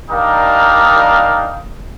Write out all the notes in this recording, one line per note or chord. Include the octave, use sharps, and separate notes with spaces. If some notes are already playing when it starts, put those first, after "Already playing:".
G3 D4 D#4 A#4 F5